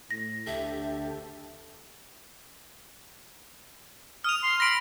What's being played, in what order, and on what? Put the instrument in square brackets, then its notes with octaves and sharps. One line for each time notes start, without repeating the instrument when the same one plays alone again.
[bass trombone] A2 [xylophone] A#6
[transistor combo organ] D2 G4 A4 [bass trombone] D3 [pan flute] E5
[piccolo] D#6 [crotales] F6 F7
[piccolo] C6
[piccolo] B5 [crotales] A#6 D7